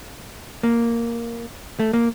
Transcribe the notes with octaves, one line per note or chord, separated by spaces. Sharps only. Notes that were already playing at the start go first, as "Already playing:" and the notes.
A#3
A3
A#3